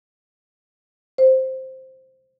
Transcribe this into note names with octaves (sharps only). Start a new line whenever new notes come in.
C5